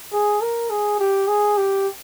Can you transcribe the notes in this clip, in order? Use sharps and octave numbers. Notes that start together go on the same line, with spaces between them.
G#4
A#4
G#4
G4
G#4
G4